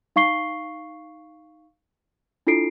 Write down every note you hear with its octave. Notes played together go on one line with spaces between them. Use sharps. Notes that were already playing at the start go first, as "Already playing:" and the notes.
D#4 F5 C#6 C7 G7
D4 E4 F4 A4 C7 D7